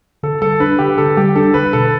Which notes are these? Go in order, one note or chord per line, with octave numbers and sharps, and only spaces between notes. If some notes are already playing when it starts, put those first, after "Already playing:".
D3 A4
G3 A4
D4 B4
D3 G4
D3 A4
G3 G4
D4 A4
D3 B4
B2 A4